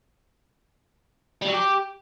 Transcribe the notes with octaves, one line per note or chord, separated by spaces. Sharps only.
G3
F#3
G4